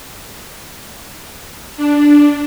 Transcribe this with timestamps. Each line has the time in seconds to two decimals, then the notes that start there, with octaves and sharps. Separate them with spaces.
1.77 D4